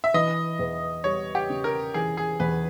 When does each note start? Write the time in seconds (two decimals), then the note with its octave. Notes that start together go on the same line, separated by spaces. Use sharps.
0.04 E5
0.14 E3 D#5
0.59 E2
1.04 G3 C#5
1.35 G4
1.50 C#3
1.64 A#4
1.94 E3 G#4
2.17 G#4
2.40 E2 B4